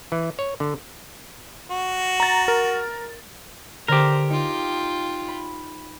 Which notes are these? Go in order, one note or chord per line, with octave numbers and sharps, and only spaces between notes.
E3
C#5
D3
F#4
A#5 A6
A#4
D3 G4 A#4 C5
D#4 F4 G5
B5